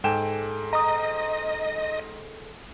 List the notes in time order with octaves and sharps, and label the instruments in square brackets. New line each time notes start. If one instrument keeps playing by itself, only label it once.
[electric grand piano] G#2 G5 E7 [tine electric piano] G#4 A4 G#5
[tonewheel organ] D#5 [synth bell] A#5 D#6